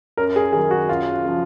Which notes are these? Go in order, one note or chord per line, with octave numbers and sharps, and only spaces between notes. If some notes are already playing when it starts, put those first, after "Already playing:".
F#2 A#4
G#4
D#3 F#3 G#4
F#4
F#2 F4
C#3 F3